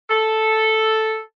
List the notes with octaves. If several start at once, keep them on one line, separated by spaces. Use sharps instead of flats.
A4